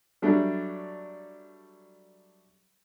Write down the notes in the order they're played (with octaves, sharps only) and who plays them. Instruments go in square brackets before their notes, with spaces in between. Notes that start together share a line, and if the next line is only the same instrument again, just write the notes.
[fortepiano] F#3 G3 A3 D4